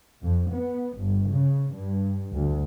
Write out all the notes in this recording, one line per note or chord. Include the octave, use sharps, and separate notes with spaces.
F2
B3
G1
C#3
G2
D2